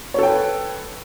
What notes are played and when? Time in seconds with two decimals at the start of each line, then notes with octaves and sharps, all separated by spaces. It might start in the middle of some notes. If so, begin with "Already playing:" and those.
0.14 C#5
0.19 A4
0.23 G5
0.27 B4